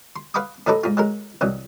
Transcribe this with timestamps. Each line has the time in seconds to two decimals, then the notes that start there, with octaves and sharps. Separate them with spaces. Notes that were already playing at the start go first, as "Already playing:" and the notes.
0.16 C6
0.34 B4 F5 F#5 B5 D6 D#6
0.67 A2 F#3 D#4 A4 B4 D6
0.84 G#2 F4
0.97 F#3 G#3 A#4
1.41 C2 D#3 E3 F#3